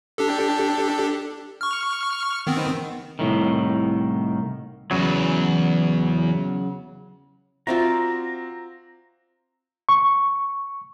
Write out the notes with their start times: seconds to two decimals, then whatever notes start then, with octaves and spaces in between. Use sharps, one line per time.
0.18 D4 G4 A4
1.61 C#6 F6
2.47 D#3 B3 C4
3.19 C2 A2 D#3
4.91 E2 C#3 F#3
7.67 C4 F4 F#4 D5 E5 A#5
9.89 C#6